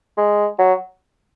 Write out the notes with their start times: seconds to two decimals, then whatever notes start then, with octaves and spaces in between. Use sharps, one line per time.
0.17 G#3
0.58 F#3